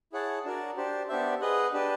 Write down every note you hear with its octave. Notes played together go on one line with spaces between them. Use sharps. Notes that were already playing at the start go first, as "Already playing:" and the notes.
E4 G#4 C#5 F#5 A5
D4 F#4 A#4 D5
D4 G4 C5
B3 D4 G4 C5 E5
G#4 B4 D#5 F#5
D4 G4 B4